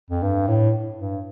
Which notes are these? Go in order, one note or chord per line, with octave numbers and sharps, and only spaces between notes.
F2
G2
A2
G2